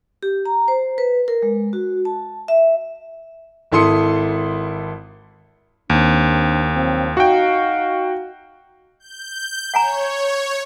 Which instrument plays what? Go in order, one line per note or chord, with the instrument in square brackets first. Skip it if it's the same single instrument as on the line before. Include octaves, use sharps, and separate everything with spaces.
[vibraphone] G4
A#5
C5
B4
A#4
G#3
F#4
A5
E5
[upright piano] G#1 E4 A4 C6 D#6 C#7
[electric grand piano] D#2 [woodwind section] C4 D4
[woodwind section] F3 F#3 C4
[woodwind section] D#4 F5 [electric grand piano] F#4 G5
[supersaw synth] G6
[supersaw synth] C#5 [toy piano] F#5 G#5 A#5